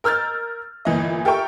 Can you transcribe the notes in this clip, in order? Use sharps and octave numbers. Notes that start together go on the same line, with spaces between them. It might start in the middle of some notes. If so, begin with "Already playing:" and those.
A#4 E6 F6 G6 A6
G1 A#2 E3 D#5
G4 A4 A#4 E5 G5 C#6